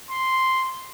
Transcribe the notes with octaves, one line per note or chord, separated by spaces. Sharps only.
C6